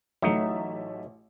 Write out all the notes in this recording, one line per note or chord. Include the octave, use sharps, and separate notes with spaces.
A1 F#3 A3 D#4 E5